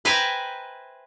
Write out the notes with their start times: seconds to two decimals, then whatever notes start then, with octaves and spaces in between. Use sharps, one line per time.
0.05 B4 C5 E5 G5 G#5 A#5